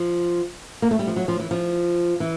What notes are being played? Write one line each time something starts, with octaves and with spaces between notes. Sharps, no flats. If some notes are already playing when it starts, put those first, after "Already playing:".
Already playing: F3
A#3
A3
G3
F3
F#3
F3
E3
F3
E3